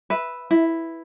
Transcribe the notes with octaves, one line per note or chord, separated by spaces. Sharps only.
B4 E5
E4